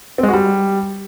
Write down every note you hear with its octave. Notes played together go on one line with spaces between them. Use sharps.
C4
G#3
F#4
G3